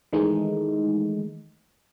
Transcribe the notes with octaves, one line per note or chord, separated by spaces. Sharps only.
D#3 E3 G#3 A3 D#4